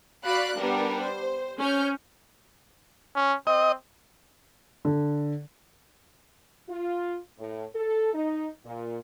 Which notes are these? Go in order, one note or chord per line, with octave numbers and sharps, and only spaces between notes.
F#4 D5 F5 B5 F#6
G3 B3 D4 A#4
C5
C#4 F6 G6
C#4
C4 D#5
D3
F4
A2
A4
D#4
A#2